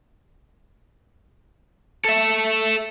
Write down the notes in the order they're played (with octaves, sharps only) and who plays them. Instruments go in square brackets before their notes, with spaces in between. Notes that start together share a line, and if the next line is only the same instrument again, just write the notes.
[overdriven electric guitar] A4 E5